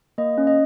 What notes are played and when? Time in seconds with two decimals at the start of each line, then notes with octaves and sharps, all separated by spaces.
0.18 A#3 D#5
0.38 C#4
0.47 D#5